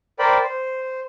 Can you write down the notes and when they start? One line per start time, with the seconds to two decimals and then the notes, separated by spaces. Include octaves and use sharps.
0.19 A#4 C5 D5 G5 B5
0.43 C5